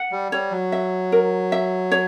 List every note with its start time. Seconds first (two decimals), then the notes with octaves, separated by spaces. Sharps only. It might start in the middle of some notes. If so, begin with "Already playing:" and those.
Already playing: F#5
0.12 G3
0.32 G3 C#5
0.51 F#3
0.72 E5
1.12 A#4
1.52 E5
1.91 C#5